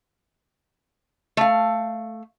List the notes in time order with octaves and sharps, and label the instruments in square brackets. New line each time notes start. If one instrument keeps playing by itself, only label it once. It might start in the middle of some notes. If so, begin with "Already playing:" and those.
[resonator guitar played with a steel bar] A3 F5